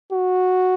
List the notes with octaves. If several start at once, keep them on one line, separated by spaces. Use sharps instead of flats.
F#4